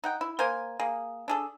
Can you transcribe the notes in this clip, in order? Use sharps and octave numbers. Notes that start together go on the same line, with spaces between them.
D#4 F#5 G5
E4
A#3 A#4 C5 G#5
A#3 G#4
D4 G#4 A4